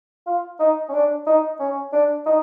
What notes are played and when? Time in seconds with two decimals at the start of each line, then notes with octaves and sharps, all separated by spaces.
0.27 F4
0.60 D#4
0.89 C#4
0.93 D4
1.27 D#4
1.60 C#4
1.93 D4
2.26 D#4